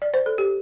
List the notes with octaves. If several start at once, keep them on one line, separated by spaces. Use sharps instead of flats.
D5
C5
A4
G4